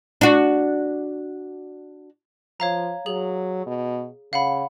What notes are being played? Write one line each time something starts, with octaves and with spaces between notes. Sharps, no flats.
D4 F#4
F3 C#5 F5 A#5
F#3 G#4 F#7
B2
C#3 F5 F#5 B5